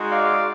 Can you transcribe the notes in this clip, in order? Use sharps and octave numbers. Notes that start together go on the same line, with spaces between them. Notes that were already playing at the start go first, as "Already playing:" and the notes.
Already playing: G#3 D#4 F#4
D5 F5